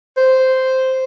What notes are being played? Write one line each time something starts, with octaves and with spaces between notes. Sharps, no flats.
C5